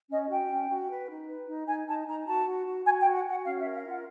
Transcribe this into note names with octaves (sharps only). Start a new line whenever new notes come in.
C#4 D#5
F#4 G5
C#4
F#4
B4
D#4
B4
D#4
D#4 G#5
D#4 A5
D#4 A#5
F#4 A5
F#4
F#4
F#4 G#5
G5
F#4
F#5
F#4
F#5
C#4 F5
E5
A#4
F5
F4 F#5